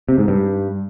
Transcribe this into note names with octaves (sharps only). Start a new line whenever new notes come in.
C3
G#2
G2